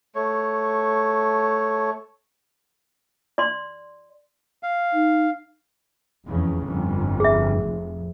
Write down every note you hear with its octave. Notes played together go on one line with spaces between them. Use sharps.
A3 C#5
D5 C6
F5
D#4
F1 E2 C#3
G1 F2
G#4 E5
F1